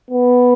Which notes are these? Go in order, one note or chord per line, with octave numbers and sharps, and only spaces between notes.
B3